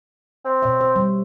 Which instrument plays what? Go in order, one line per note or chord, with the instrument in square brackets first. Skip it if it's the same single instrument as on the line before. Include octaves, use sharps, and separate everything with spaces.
[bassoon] C4
[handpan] B2 C#5 E5
C5
G3